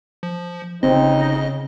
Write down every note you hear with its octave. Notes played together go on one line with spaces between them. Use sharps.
F3
G1 C#3 C4 D#4 D#5